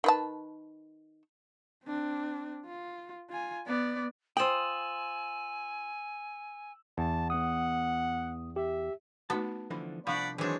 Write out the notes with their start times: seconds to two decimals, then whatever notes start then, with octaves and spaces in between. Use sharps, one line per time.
0.04 D#3 B4 A5
1.84 C4 D4
2.66 F4
3.30 F4 G#5
3.67 B3 D5
4.37 F4 C5 G5 G#5 D#6 E6 E7 F#7
6.98 E2 A5
7.30 B3 F#5 D#6
8.56 G4 E5
9.30 A3 B3 D#4 F#4 A5
9.70 D3 E3 F3 B5
10.07 C2 F3 D4 D5 F5 F#5 B5 C#6
10.38 D#3 E3 F#3 G#3 C4 D4 C#5